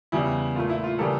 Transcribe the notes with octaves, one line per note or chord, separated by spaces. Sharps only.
E2 C#3 G3 E4
A#2 A3 F4
E4
F4
C#3 E3 G3 A#3 A4